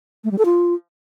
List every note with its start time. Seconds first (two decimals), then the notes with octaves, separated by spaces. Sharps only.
0.24 A3
0.31 G3
0.38 A4
0.45 F4